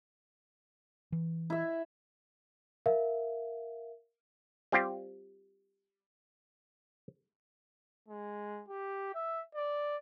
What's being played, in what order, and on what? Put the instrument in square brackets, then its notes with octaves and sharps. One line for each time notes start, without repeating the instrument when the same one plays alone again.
[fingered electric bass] E3
[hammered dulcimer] E4 E5
[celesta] A#4 E5 F5
[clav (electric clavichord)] G3 C4 F4 G4
[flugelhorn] G#3
G4
E5
D5